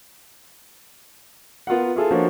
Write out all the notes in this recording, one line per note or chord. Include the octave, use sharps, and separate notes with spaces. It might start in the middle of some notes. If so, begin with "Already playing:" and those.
B3 F4 A#4 F#5
E4 F4 G#4 A4
F3 A#3 D4 F#4 C#5